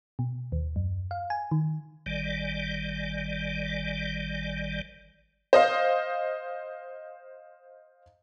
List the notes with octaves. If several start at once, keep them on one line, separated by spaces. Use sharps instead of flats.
B2
D#2
F#2
F5
G#5
D#3
G#1 D#3 G3 D5
C5 D#5 F5